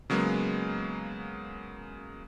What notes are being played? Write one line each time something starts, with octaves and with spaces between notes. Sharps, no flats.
C#3 F#3 G#3 A#3 B3